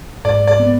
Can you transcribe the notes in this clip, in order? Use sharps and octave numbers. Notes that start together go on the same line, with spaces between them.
G#2 D5
D5
B3